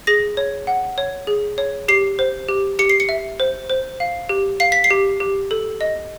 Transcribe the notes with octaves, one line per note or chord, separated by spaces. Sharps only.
G#4 A#6
C#5
F#5
C#5
G#4
C#5
G4 C7
C5
G4
G4 C#7
C7
C#7
E5
C5
C5
F5
G4
F5 C7
B6
C7
G4
G4
A4
D#5